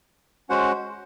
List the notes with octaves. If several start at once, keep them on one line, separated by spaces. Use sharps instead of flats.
G#3 C#4 F#4 C5 F#5